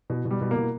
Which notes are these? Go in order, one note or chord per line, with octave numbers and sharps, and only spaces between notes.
B2
B2
G3
B2
A#3
B2